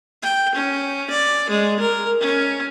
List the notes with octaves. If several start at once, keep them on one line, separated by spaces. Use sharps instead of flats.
G5
C#4
D5
G#3
A#4
C#4